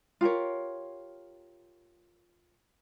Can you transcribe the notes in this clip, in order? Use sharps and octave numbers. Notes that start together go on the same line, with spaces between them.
F4 G4 A#4 C#5